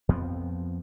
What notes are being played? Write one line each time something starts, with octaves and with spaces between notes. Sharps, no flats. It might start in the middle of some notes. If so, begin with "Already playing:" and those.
F2 F3 B3 C4